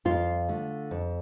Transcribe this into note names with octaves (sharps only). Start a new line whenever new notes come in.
F2 F4
D3 A3
F2